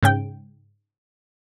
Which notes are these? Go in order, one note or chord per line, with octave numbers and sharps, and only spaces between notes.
G#2 C#3 G5